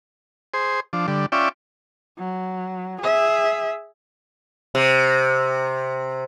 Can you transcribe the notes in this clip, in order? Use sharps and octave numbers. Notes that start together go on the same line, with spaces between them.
G#4 C5
F3 D4
D3 G3
C#4 F4 D5 E5 G5
F#3
G#4 E5
C3